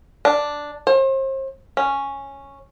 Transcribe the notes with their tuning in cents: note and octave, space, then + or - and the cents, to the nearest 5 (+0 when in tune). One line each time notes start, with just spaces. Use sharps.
D4 +0
C5 +40
C#4 -5